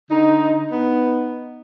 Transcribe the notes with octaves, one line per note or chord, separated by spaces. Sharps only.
D3 D#4
B3 D#4